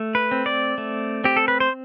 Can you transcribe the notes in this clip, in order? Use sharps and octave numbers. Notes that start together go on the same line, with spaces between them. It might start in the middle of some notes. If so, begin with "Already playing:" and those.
Already playing: A3
B4
C4
D5
A3
C4 G4
A4
B4
C5